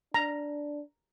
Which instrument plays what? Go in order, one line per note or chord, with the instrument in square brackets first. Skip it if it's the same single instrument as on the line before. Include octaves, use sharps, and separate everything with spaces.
[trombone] D4 [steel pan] A#5